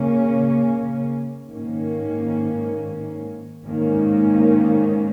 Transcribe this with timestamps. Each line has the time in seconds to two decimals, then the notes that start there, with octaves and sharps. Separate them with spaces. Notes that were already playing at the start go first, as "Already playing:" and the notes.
Already playing: C#3 A#3 C#4
1.50 G#2 D#3 A#3 C#4
3.66 G#2 D#3 A#3 C#4